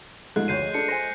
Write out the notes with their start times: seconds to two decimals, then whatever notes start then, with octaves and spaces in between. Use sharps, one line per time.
0.36 G#2 G#3 A3 F4 F#6
0.48 F1 D2 C#5 G6 C7 D#7
0.74 D4 A4 C#7
0.88 C5 G#5 A#6 D#7